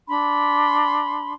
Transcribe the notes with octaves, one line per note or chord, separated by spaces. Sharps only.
D4 B5 C6